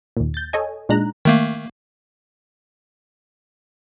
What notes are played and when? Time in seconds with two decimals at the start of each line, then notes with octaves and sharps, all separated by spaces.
0.17 D#2 A#2
0.34 G6 A6
0.53 A4 C#5 D#5 G#5
0.89 A#2 G#3 D4 D#4 A#5 F#6
1.25 D#3 A3 A#3